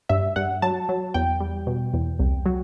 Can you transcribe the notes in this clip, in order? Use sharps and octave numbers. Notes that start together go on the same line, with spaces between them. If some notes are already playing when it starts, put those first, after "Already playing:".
G2 E5
G2 F#5
F#3 A5
F#3
E2 G5
G3
B2
E2
C2
F#3